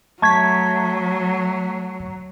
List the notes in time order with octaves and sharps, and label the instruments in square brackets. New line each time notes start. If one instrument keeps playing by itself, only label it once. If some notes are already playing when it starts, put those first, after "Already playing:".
[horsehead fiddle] F#3 [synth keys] A3 B6 [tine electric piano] A5 C#6 G#6